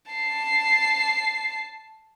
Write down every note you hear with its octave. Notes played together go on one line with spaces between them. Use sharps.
A5 C7